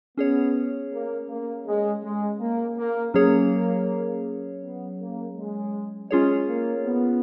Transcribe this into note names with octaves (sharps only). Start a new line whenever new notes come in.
B3 C#4 G#4 C#5
A#3
A#3
G#3
G#3
A#3
A#3
F#3 A#3 C#4 G#4 C#5
B3
A#3
G#3
G#3 C#4 F4 G#4 C#5
A#3
B3